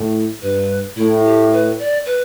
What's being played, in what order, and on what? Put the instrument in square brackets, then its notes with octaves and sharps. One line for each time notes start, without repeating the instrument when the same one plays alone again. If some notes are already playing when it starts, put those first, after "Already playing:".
Already playing: [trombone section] A2
[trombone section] G2 [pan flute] B4
[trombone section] A2 [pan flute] E4
[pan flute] G4
B4
D5
B4